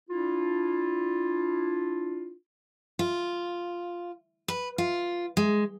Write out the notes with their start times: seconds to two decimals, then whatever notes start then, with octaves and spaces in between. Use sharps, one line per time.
0.09 D4 E4 F4
2.99 F4
4.48 B4
4.78 F4
5.37 G#3